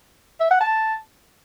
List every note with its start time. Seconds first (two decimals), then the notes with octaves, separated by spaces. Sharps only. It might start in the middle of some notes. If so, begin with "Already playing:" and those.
0.40 E5
0.51 F#5
0.61 A5